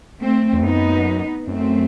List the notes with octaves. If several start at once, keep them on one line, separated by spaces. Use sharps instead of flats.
A3 C4
E2
F#2 B3 D#4
F#2 A3 C4